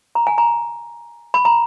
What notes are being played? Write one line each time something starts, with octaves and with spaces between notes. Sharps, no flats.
A#5
G#5
A#5
B5
A#5